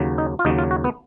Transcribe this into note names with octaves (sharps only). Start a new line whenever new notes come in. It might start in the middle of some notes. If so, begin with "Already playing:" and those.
Already playing: D#2 C#3 F#3
D#4
F4
D#2 C#3 F#3 D#4
F4
F#4
B3